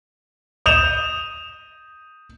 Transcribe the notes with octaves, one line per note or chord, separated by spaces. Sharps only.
D#6 G6 E7 F7